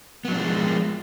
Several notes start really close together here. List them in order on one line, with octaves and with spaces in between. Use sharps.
B3 F#3 D4 F3 G#3